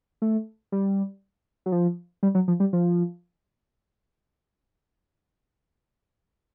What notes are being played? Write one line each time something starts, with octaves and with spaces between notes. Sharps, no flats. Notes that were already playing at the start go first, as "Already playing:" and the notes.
A3
G3
F#3
F3
G3
F#3
F3
G3
F3